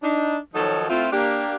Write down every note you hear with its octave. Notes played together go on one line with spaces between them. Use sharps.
D4 D#4
D#3 F3 F#3 D#4 A4 C#5
A3 C4 E4 F4
A#3 D4 G4